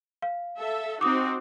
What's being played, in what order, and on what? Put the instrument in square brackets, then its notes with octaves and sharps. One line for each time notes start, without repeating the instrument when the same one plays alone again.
[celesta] F5
[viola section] A4 E5
[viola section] C4 D#4 F#4 [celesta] D6 D#6